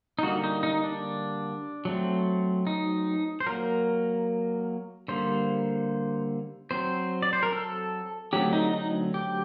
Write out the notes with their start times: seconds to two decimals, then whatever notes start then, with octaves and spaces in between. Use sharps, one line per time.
0.19 D#4
0.23 D3 G3 A#3 F#4
0.44 D#4
0.63 D#4
0.84 D4
1.85 F#3 A3 C4
2.67 D#4
3.40 C5
3.46 F#3 A#3 A#4
5.08 D3 G3 A#3 C5
6.71 F#3 C4 C5
7.22 D5
7.33 C5
7.43 A#4
7.52 A4
8.33 D3 F#3 A3 C4 G4
8.53 D#4
8.73 D#4
9.14 G4